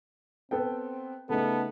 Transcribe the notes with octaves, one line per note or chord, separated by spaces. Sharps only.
B3 C4 A4 G5
C#3 A3 B3 D#4 A4